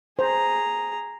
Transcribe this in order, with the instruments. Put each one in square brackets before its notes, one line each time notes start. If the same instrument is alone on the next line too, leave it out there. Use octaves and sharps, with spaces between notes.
[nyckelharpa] G#4 A#5 [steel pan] C5